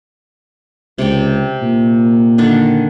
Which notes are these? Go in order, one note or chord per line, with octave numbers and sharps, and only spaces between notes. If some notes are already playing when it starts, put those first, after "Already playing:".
C#2 C3 D5 G5
A#2
D3 D#3 D4